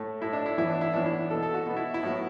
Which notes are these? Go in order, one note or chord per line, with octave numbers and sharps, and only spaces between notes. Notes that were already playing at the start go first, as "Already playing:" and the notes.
Already playing: A2 A3
A2 A3 E4
D4
E4
A2 E3 B3 E4
D4
E4
A2 E3 B3 D4
E4
B2 A4
B3
A4
F#4
B2 B3
E4
E4
A2 F#3 B3